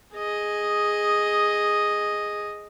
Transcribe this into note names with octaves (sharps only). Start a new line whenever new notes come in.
G#4 D#5